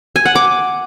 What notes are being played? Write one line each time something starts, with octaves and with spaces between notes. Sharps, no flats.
G#5
F#5
D6